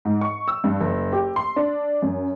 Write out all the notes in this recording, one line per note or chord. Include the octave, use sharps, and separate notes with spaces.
G#2
C#6
E6
G2
F#1
G4
C6
D4
F#2